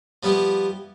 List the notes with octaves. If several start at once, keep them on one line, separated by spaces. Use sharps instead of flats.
F3 G3 B3 E4 G4